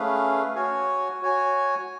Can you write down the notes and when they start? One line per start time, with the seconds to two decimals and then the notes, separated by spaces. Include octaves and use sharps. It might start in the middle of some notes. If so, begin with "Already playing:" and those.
Already playing: A3 C#4 G#4 B4 F5
0.56 F#4 C#5 G#5
1.22 F#4 C#5 G#5